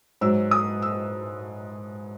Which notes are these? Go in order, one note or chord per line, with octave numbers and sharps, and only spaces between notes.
G#2 F#3 E6
D#6
E6